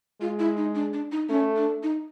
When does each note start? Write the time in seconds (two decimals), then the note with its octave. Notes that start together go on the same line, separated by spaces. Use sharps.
0.21 G#3 F4
0.39 E4
0.57 D#4
0.75 D4
0.93 D4
1.12 D#4
1.29 A3 C#4
1.56 D4
1.83 D#4